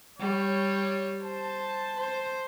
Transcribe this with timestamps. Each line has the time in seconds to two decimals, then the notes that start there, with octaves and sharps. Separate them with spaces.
0.19 G3 C#5
1.22 C5 A5
1.97 C5